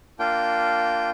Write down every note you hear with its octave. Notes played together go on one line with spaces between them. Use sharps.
A#3 D4 F4 G5